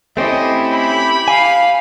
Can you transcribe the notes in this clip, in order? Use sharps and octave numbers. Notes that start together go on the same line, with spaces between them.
A3 C4 C#4 E4 G4 D#5
B5
F5 G#5